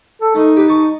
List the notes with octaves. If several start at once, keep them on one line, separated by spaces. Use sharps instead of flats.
A4
A3 D#4
G4 B4
A5 C#6